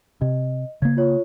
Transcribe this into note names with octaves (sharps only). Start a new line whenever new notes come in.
C3 D#5
C#3 A#3 G#6
F4 C#5